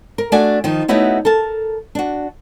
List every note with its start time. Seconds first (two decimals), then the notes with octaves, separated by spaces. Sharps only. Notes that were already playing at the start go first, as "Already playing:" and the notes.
0.18 A#4
0.32 A3 D4 F#4 D5 G#5
0.64 D#3 F3 D#4
0.88 A3 B3 D#4 E4 F#4 C#5
1.25 A4 A#4 A5
1.95 D4 F#4